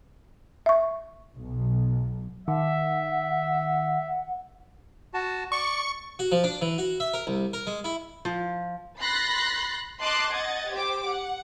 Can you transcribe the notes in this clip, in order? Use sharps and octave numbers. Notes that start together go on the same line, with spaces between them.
E5 C#6
B1
D#3 E5 F#5
F#4 A5
D5 C#6
F#4
F3
D4
E3
F#4
E5
A#4
C2
A#4
G#3
E4
F3
B5 C6 F#6 A6 A#6 C7
D#5 A5 C6 D6 F#6 C7
D#5 F#5 G#6 A6
G4 C5 D6
F#5